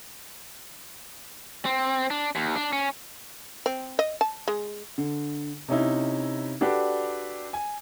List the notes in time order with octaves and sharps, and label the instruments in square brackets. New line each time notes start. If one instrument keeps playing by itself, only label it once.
[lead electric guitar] C4
D4
D#2
D4
C#4
[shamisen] C4
D#5
A5
G#3
[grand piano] D3
C3 C#4 D#4 E4
D4 F#4 G4 A4 B4 D5
G#5